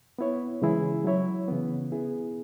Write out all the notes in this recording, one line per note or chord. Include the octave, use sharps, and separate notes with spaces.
B3 E4 C#5
C#3 E3 G#3 E4 G#4
F#3 E4 C#5
C#3 E3 B3
B3 E4 G#4